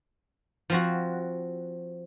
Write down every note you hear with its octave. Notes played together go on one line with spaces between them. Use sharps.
F3 C4 F#4